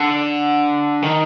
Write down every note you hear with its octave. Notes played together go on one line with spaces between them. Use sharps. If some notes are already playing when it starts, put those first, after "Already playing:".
Already playing: D3
D#3